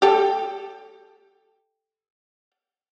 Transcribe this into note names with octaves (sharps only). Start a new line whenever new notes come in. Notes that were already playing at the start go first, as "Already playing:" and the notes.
G4 A4